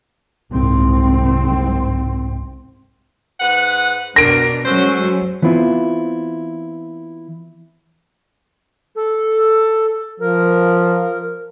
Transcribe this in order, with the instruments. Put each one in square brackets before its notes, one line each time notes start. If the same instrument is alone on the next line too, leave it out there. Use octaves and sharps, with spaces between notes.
[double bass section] F#1 C2 G#2 C4
[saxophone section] G#2 B4 F#5
[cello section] B2 D4 [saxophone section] A#4 [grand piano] A#6 D7
[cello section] F#3 G#3 C#4 [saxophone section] F#4 A4 C5
[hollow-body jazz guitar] E3 B3 C4 E4 F4
[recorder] A4
[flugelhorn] F3 [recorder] A#4